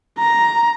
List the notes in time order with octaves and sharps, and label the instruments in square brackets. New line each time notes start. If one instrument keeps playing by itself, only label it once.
[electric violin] A#5